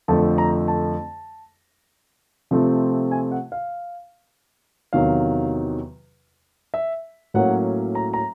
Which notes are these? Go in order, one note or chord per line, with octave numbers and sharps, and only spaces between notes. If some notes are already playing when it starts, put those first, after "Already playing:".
F2 D3 F3 A3 A5
A#5
A5
C3 F3 A3 C4
G#5
F#5
F5
E2 C3 D#3 F#3 F5
E5
A2 F#3 A#3 C#4 F#5
A#5
A#5